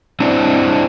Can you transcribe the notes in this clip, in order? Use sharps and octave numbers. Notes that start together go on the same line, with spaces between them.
C4 D4 E4